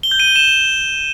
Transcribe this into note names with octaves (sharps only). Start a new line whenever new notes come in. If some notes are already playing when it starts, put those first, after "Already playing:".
G7
G6
D#7
G7
E7